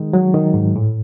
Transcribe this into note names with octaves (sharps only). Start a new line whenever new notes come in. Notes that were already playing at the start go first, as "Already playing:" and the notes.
Already playing: D#3 G#3
F#3
D#3
G#2
A2